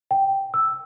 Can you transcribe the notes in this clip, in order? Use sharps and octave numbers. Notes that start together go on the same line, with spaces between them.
G5
E6